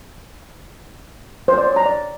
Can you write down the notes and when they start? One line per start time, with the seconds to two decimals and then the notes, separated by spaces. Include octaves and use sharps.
1.48 C5
1.58 D5
1.67 C#5
1.76 A#5
1.86 D5